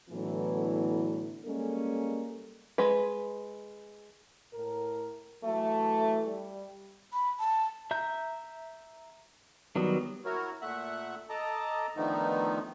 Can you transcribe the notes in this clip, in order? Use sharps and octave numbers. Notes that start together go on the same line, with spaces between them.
A2 D3 E3 F#3 B3
G3 G#3 A#3 C#4 A4
G#3 B4
A2 A#4
E3 F#3 A3
G3
B5
A5
E5 A#5 G6
D#3 F#3 G3 B3
E4 F#4 A#4 C#5
A#2 A3 E5 F#5 F#6
A4 D#5 A5 A#5 D6
D3 D#3 F3 A3 B3 D#4